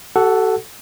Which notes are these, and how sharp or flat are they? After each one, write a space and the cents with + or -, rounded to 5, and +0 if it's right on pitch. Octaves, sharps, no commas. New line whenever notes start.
F#4 +45 A4 +0 F#5 +0